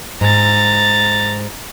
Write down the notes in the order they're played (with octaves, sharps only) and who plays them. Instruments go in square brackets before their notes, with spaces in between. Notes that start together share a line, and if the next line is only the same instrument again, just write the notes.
[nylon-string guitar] G#2 [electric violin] A#5 A6